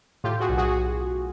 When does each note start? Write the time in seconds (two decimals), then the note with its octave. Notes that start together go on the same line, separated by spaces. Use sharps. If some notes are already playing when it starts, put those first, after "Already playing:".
0.24 A2 F4 G4
0.40 F#4 G#4
0.49 B1
0.58 F#4 G#4